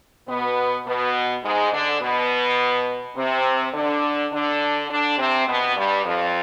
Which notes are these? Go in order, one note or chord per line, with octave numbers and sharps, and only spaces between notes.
B2 B3
B2 B3
G#2 G#3
D3 D4
B2 B3
C3 C4
D3 D4
D3 D4
D3 D4
C3 C4
B2 B3
G2 G3
F2 F3